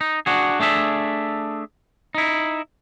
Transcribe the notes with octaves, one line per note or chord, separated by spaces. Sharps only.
D#4
D4 F#4 G#4
A3 D4 G#4 E5
D#4 E4